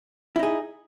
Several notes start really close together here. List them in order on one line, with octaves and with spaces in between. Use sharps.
E4 D#4 G#4